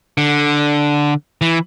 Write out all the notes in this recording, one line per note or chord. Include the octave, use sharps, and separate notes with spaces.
D3
E3